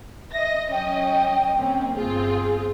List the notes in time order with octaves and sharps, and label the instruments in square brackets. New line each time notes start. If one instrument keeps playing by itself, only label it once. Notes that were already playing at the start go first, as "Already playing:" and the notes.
[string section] D#5 A#6 [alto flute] E5
[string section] F#3 C#4 D#5 [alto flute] G5
[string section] A#3 C4 C#4
[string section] G1 C4 F4 [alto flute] G#4